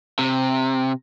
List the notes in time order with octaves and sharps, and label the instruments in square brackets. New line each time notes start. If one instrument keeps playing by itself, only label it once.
[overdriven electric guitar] C3